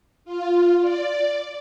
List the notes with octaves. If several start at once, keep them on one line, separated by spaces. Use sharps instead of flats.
F4
D5